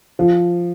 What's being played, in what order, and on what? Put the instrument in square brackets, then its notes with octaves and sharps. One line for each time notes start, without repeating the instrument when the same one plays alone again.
[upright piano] F3